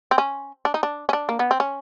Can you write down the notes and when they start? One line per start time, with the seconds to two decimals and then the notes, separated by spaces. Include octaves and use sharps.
0.11 C4
0.18 C#4
0.65 D4
0.74 D#4
0.83 D4
1.09 C#4
1.13 D4
1.29 A#3
1.39 B3
1.51 C4
1.60 C#4